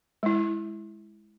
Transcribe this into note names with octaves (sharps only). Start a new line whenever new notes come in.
G#3 E4